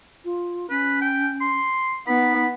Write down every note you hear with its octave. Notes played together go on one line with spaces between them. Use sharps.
F4
C#4 B4
G5
C6
B3 D#4 B5